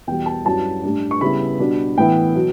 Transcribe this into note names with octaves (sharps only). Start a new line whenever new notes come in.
E2 B2 G3 G5
A5
G2 F#3 C#4 E4 A5
A2 G3 D4
C#6
C#3 G3 B3 E4 B5
B2 G3 D4
A2 E3 B3 E4 G5
B2 F#3